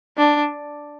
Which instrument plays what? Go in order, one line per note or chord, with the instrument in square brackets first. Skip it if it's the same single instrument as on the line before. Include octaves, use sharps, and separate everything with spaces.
[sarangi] D4